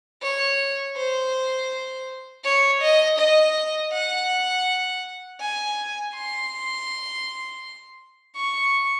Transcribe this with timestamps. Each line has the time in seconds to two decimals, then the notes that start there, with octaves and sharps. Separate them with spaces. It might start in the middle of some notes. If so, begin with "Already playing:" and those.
0.22 C#5
0.97 C5
2.44 C#5
2.82 D#5
3.19 D#5
3.93 F#5
5.41 G#5
6.14 C6
8.36 C#6